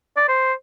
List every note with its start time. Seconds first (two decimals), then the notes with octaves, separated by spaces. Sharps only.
0.17 D5
0.28 C5